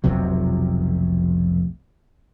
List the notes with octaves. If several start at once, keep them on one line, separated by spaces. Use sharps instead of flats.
F1 B1 C3 F#3